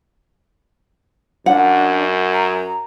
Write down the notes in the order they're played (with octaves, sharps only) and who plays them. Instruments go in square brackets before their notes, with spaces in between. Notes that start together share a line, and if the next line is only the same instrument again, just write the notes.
[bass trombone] F#2 [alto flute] D4 [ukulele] F#5
[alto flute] A#5